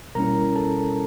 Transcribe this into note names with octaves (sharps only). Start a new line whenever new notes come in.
B2 G3 A#3 C#4 E4 A#4 A#5
A4 A5